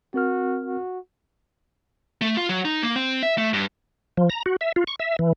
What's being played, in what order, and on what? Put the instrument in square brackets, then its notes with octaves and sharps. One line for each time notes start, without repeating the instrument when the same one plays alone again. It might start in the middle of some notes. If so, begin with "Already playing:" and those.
[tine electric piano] C4 A#4 F6 [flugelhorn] F#4
[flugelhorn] F#4
[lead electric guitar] A3
F4
F#3
D#4
A#3
C4
E5
A3
G2
[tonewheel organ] F3
A#5
F#4
E5
F4
C#6
E5
E3